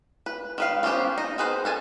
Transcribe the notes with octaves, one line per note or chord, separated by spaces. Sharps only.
B4
D#3 B4 F5
B3 C#4 F4 G4 C5
D#4
D#3 G#4 B4 C5
C#4 A4 G#5